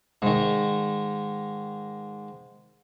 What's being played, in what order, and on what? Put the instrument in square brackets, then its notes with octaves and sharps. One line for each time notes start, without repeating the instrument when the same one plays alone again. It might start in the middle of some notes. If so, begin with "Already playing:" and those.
[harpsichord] G#2 D#3